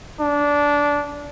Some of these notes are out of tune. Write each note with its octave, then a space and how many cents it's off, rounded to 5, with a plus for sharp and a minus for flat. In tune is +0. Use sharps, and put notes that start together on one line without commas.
D4 -15